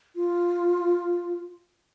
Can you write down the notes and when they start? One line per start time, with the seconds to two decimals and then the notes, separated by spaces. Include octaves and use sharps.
0.16 F4